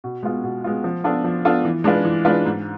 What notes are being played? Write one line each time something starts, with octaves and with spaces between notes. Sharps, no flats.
B2
G#3 B3 F4
B2
G#3 B3 F4
F3
B3 D4 F4 A4
F3
B3 D4 F4 A4
E3
G#3 D4 F4 B4
E3
G#3 D4 F4 B4
G#2